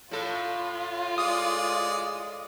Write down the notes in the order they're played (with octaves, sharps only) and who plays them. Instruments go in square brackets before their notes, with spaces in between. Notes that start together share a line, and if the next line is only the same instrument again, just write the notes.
[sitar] A2 A4 [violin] F4
[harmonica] G#3 D5 [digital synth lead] D#6